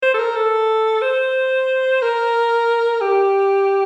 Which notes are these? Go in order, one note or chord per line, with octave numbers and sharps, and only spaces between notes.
C5
A4
A#4
A4
C5
A#4
G4